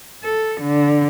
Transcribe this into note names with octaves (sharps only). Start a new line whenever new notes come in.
A4
D3